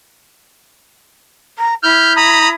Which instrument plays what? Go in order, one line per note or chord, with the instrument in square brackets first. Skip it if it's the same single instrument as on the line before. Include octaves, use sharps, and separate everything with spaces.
[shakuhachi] A#5
[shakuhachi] E4 [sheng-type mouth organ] F6 G6
[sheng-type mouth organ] A#5 B5 D#6